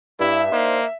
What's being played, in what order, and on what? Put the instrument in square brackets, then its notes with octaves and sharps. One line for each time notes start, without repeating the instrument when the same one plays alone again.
[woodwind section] G2 [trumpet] E4 [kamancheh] E5
[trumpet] A#3 [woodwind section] D4 D#4 C5